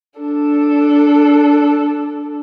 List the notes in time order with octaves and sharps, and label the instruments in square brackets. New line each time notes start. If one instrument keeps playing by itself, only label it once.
[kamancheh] D4 A4